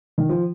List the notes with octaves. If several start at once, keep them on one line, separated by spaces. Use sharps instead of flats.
D#3
F3